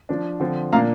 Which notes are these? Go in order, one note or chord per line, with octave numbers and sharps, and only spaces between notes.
F3 D4
D3 F3 C4
A#2 A#3 D4 F5 A#5